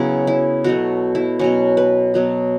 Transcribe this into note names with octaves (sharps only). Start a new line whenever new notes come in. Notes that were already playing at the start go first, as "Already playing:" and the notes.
Already playing: C#3 F#3 B3 E4
E4
B2 F#3 A3 F#4
E4
B2 F#3 C#4 F#4
B4
B2 F#3 B3